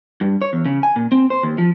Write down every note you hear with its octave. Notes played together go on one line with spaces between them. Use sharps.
G2
C#5
E2
C#3
G#5
A#2
C4
C5
D#2
F3